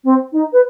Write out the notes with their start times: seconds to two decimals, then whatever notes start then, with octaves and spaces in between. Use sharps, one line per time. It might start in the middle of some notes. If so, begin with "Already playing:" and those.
0.04 C4
0.32 D#4
0.53 B4